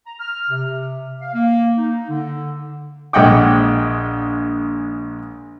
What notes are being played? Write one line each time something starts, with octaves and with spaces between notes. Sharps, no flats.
A#5
F6
C3
F5
A#3
D#4
D3
A#1 G#3 D#5 F#5 G5 D6